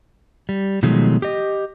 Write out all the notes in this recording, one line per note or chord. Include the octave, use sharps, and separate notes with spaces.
G3
B2 D#3 F3 F#3 G#3 A3
G4 D#5